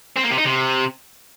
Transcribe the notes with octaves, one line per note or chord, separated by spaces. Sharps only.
C4
A#3
C3
D#4
C3